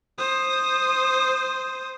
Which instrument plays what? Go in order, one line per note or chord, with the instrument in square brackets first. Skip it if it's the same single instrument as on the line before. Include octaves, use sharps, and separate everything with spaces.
[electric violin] C5 D#6